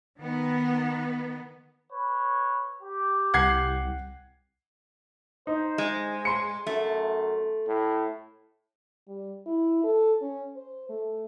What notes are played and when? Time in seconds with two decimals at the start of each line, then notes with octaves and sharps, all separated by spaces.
0.18 D#3 B3
1.93 B4 C#5
2.83 G4
3.34 C2 F#5 G#6 C7
5.47 D#4 C5
5.78 G#3
6.25 C6 C#7
6.67 F#2 A3
7.67 A2
9.08 G3
9.46 E4
9.84 A4
10.22 C#4
10.56 C5
10.89 A3